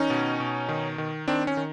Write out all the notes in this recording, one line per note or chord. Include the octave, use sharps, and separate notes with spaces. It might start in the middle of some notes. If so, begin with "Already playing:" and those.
Already playing: D#3 C#4 D#4
B2
B2
D#3
D#3
D#3 C4 D4
C#4
D#3